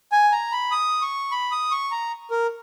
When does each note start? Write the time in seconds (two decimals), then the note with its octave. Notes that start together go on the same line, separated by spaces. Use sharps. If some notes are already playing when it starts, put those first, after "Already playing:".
0.12 G#5
0.32 A#5
0.52 B5
0.71 D#6
1.01 C#6
1.32 B5
1.52 D#6
1.71 C#6
1.91 A#5
2.31 A#4